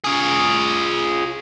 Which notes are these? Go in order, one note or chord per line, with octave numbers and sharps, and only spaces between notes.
F4 G#4